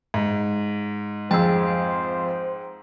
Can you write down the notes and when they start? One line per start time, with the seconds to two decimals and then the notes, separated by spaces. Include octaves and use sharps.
0.14 G#2
1.31 F2 G#4 C5 G5 E6